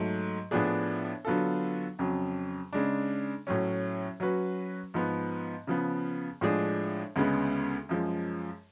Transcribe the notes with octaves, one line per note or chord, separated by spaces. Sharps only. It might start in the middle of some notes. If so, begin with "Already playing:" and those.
Already playing: G#2 F#3 A3
A2 F3 B3 D4 G#4
D3 F#3 B3 F4 A4
F2 C#3 F#3
C#3 G#3 D4
A2 F#3 C#4
F#3 C#4 F#4 B4
G#2 F3 B3
C#3 F3 B3
A2 F3 G#3 D4 G#4
D2 C#3 G#3 B3
F#2 F3 G#3